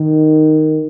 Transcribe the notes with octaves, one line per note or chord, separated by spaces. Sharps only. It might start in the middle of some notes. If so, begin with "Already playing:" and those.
Already playing: D#3